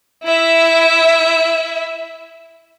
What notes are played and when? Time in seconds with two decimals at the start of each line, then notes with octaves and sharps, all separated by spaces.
0.24 E4 E5